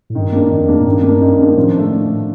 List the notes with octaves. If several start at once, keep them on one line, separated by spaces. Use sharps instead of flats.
A2
G2 D#3
A#3 D4
F2 D#3
A#3 D4
A2
G2 D#3
A#3 D4
D#3
A#3 D4
A2 F3
A3 D4